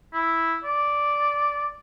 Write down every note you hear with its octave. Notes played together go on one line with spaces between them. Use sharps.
E4
D5